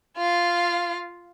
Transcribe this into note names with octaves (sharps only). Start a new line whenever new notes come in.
F4 F5